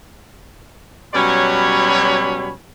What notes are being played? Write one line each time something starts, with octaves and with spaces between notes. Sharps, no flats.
B2 F#3 G3 C#4 C#5 B5